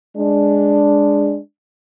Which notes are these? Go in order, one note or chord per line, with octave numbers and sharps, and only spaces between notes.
G#3 D4